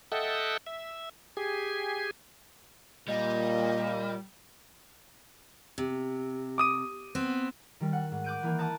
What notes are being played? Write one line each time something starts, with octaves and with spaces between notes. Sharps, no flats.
A4 D#5 E5 F#5 G5 A5
E5
G4 G#4 G#5
A#2 G3 D#5
C3
D6 D#6 D#7
B3 C4 B4
D#3 G3
F#5
G#2
D6 F#6 G6 D7 D#7
E3 A#3 G#5
F#5 A5 A#5 D6 D#6 A6